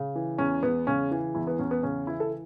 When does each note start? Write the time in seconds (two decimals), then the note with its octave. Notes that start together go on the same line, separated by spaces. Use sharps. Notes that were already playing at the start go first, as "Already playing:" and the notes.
Already playing: C#3
0.16 E3
0.38 E2 C#4
0.63 E2 B3
0.87 C#3 C#4
1.11 E3
1.35 E2 E4
1.47 B3
1.59 E2 C#4
1.71 B3
1.83 C#3 C#4
2.07 E3 E4
2.20 A4